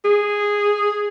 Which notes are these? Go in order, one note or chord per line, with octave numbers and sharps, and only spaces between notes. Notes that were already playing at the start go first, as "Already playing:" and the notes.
G#4